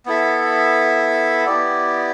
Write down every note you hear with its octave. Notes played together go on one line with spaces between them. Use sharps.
B3 E4 A4 E5
B3 E4 G4 D5